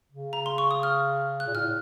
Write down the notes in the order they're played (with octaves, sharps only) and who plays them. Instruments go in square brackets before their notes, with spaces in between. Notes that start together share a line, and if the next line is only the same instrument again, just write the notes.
[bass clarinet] C#3
[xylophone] A#5
C6
C#6
D#6
F6
F#6
[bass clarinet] A#2
[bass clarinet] A2 [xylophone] F6